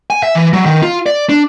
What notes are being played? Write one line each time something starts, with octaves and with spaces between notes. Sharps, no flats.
G#5
E5
E3
F#3
D#3
F4
D5
D4